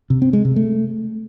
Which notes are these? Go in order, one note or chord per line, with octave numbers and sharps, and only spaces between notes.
C3
C4
G#3
C3
A3